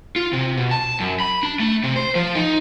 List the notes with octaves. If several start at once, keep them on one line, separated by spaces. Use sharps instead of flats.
F4
C3
B2
A5
F#2
B5
D4
A3
C3
C5
F3
D#4